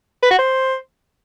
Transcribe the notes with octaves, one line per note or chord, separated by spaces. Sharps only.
B4
F#4
C5